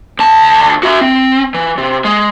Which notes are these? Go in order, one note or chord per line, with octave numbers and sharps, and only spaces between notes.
D2 A5
F#4 E5
C4
E3
C3
G#3